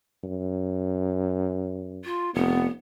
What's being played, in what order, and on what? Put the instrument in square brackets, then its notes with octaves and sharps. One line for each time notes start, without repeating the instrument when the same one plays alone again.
[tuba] F#2
[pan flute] F4
[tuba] F1 [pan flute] B3